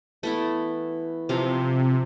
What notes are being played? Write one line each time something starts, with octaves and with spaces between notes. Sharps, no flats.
E3 A3 B3 E4
C3 F3 F5